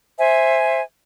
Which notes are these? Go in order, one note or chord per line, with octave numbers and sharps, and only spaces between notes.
C5 E5 G#5